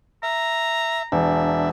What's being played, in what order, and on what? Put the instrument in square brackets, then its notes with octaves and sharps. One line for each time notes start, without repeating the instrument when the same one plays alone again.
[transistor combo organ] E5 [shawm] A#5
[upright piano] E1 [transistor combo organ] D4 E5